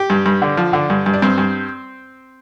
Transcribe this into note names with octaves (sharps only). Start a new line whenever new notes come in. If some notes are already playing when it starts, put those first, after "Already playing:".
Already playing: G4
G2
G2
D3
F3
D3
G2
G2
D4
G2 C4
G2